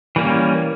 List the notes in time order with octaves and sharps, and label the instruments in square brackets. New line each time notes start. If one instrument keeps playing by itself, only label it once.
[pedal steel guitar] E3 G3 A#3 C#4